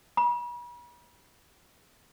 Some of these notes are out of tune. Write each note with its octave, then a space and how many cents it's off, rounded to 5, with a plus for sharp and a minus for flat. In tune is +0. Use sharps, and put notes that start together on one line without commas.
B5 -40